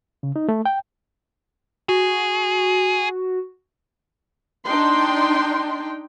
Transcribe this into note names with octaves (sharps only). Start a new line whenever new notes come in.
C#3
D#4
A3
G5
F#4 G#4
D4 D#4 G5 C6